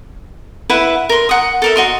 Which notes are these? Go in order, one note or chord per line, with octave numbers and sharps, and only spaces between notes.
E4 B4 E5 F#5
A#4 C6
F#5 D#6
A4 A#4 E5
F#4 D#5 C6